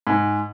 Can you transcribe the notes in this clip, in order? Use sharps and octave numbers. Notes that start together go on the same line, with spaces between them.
G#2